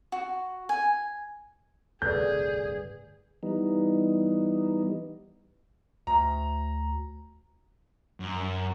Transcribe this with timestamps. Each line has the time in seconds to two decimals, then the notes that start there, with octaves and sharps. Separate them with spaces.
0.12 F#4
0.69 G#5
2.02 D1 G1 C2 G#4 A4 B4 D5 G6
3.43 E3 G3 B3 D#4
6.07 D2 A#5
8.20 F#2